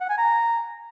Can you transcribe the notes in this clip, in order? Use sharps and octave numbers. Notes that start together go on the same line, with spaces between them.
F#5
G#5
A#5